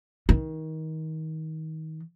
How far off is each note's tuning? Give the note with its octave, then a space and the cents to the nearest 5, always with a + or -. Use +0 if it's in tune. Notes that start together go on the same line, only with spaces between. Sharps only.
D#3 +25